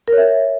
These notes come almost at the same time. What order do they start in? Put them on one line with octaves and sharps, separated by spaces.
A#4 C#5 E5